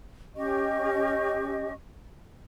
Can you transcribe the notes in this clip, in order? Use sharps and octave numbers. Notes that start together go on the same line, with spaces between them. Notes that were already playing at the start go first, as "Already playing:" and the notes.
C#4 G4 D#5 C#6